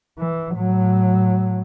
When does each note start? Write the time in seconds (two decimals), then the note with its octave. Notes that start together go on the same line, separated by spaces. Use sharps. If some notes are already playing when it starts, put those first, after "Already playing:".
0.19 E3
0.53 A2 F#3